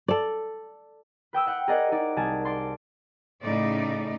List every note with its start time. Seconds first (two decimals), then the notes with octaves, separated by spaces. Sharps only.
0.08 A4 D5
1.33 B4 G5 D#6 E6
1.46 E5 F#5 G5
1.68 G#4 A#4 C5 D5 D#5 F#5
1.92 D#4 G#4 D5
2.16 C2 G#4 G#5 A5
2.45 D5 C6
3.43 A2 C#3 D#4 D5